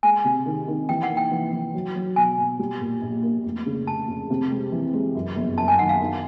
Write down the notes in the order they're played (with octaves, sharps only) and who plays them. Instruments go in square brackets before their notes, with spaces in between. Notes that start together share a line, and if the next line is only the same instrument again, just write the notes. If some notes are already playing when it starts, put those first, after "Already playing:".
[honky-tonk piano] G#3 [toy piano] G#5
[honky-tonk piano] C3
D#3
D#3
[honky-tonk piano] E3 [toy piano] G5
[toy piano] F#5
[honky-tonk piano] A#3
[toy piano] G5
[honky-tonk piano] E3
E3
F#3
F#3
[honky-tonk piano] B2 [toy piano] G#5
[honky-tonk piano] B2
G3
A#2
A#1
A#3
F1
C#3
[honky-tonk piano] F1 [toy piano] A5
[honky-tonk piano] F1
C3
G#3
E3
G#3
F#2
G1
[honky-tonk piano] F#2 [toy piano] A5
[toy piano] G#5
[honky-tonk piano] D#3 [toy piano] F#5
[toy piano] F5
[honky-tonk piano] D#3